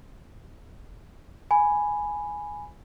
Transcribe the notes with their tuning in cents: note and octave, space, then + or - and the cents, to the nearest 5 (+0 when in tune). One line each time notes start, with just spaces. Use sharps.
G#5 +0 B5 +0